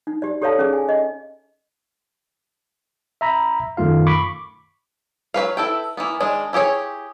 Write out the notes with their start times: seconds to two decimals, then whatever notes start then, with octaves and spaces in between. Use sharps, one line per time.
0.07 D#4
0.22 G4 D5
0.42 G4 A4 C#5 D5 F5 A5
0.59 C#4 G#4
0.73 G#5
0.89 D#5
3.21 E5 A#5 B5
3.77 F#2 D#3 A3 F4 F5
4.07 B5 C#6 D6
5.34 F#3 C#4 B4 F5
5.57 E4 A4 B4 G5
5.97 E3 A#3 B3
6.20 D#3 G#3 D4
6.53 E4 G4 G#4 C#5